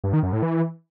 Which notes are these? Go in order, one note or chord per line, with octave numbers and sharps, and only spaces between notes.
G2
D#3
F#2
A2
E3